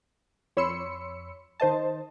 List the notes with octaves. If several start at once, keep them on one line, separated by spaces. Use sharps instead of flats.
F2 C#5 B5 C6 E6 C#7
D#3 C5 D#5 A5